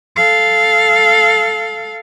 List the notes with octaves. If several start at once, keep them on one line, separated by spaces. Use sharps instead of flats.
A4 F5